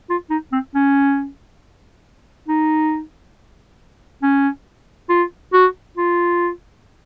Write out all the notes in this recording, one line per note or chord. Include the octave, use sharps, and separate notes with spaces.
F4
D#4
C4
C#4
D#4
C#4
F4
F#4
F4